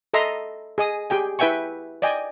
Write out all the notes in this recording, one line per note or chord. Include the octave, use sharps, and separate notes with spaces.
A4 D#5 E5 A#5 C6
G#4 D#5 D#6
G4 G#4 G5 G#5
E4 B4 E5 G5 G#5 C#6
D5 D#5 G5 G#5